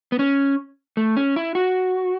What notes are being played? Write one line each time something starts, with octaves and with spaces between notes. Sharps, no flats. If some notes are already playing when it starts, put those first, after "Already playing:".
B3
C#4
A3
C#4
E4
F#4